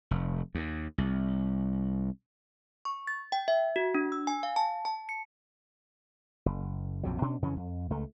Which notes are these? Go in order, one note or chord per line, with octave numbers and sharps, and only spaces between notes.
F1
D#2
C2
C#6
A6
G5
E5
F#4
D4
E6
G#5
F5
A5
A5
C#7
F#1
A#1 F2 C3 F#3
B2 C#4 D4
F2 C#3 E3 C#4
F2
C#2 A3